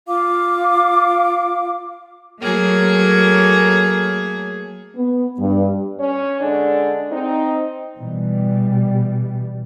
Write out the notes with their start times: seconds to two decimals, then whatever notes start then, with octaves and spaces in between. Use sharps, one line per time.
0.06 F4 F5 D6
2.40 F#3 A3 A#3 G#4 C#5
4.97 B3
5.40 G2
5.99 C#4 C#5
6.41 D3 G#3 D4
7.12 C4 D#4
7.99 B2 E3 G3